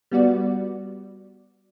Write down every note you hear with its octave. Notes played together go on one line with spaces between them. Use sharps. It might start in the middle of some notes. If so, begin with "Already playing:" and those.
G3 B3 F#4 D5